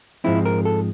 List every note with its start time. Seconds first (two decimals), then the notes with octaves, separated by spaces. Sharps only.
0.24 G#2 F3 G#3 C4 E4
0.45 A#4
0.65 A4